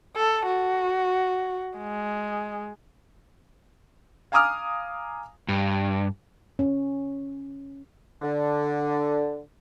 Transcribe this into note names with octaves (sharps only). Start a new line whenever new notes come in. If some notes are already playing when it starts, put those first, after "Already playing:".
A4
F#4
G#3
F5 G#5 A#5 D6 D#6 F6
G2
C#4
D3